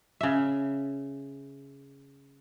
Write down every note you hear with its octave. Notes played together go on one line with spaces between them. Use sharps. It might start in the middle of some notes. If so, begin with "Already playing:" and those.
C#3 E5